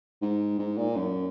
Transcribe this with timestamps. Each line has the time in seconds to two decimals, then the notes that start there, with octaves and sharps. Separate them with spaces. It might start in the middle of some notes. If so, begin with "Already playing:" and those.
0.22 G#2
0.59 G#2
0.77 A#2
0.96 F#2